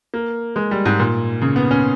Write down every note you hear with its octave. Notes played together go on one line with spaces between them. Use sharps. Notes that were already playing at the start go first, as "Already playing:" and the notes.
A#3
G#3
G3
G#2
A#2
C#3
B3
C#4